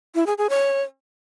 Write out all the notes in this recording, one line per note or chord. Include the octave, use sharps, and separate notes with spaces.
E4
G#4
G#4
C#5